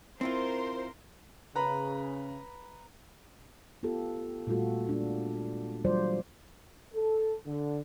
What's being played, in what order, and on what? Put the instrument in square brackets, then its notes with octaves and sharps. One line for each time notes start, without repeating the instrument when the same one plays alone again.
[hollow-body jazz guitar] C4 E4 F4 [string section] A#4 C5 C6
[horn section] C#3 [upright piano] B4 A#5 B5
[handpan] B3 F4 G4 A4
A#2 G3 A3 F4 F#4 A4
G#3 D4
E3 F#3 G3 F4 C5 D5
[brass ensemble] A4
D3